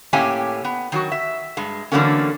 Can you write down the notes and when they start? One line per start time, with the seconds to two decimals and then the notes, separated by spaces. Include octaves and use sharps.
0.13 A2 A#3 C#4 G4 E5 G#5
0.65 B3
0.92 D#3 F#3 F#4
1.12 E5
1.57 G2 G#3
1.92 D3 E3 F#3 A3 A#3 C#4